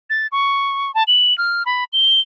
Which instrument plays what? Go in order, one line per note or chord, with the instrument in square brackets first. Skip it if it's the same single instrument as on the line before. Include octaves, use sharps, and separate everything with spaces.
[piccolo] A6
C#6
A5
F#7
F6
B5
G7